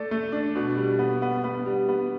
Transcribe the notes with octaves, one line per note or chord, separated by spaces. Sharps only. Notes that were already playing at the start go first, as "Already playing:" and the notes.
Already playing: A3 A4 D5
A3
D4
B2
G3
B3
B3
B3
G3
B3